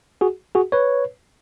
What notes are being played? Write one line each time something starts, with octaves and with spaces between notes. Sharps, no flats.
F#4 G#4
F#4 G#4
B4 C#5